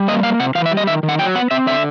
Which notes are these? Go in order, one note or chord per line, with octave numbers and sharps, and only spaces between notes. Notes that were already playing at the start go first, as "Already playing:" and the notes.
Already playing: G3
A#3 D#5
A#3 F5
C3 F#5
E3 F5
E5
G3
D#5
D#3 E5
D#3
F#5
F#3 G5
B3 F#5
C4 E5
D3 E5